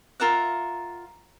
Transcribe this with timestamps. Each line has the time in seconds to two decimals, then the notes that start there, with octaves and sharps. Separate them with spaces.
0.20 F4 A#4 E5 F#5